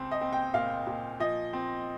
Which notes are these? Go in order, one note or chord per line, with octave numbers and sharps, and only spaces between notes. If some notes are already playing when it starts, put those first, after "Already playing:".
Already playing: C#2 C4
D#5
C4
G5
A#2 F5
A#2
F3 D#5
C4